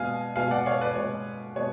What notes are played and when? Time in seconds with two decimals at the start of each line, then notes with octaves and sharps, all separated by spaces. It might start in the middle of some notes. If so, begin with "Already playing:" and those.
Already playing: B2 G#3 B3 F5 G#5
0.36 B2 G#3 B3 F5 G#5
0.51 D5 F#5
0.66 C#5 F5
0.81 B4 D5
0.96 B2 G#3 B3 C#5
1.56 B2 G#3 B3 C#5